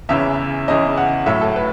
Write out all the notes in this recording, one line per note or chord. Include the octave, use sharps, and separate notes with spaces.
E2 C#3 E3 E5
E2 C#3 E3 D#5
F#5
A2 F#3 E5
A4
B4